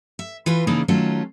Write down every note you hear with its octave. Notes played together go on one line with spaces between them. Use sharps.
E5
E3 F4 B4
C#3 E3 A#3 D4 D#4 G#4
D#3 F#3 A3 C#4 F4 A4